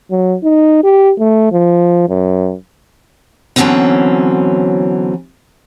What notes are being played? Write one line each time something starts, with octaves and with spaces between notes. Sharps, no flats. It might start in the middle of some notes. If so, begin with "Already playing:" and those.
F#3
D#4
G4
A3
F3
F#2
B2 D3 E3 F#3 C4 C#4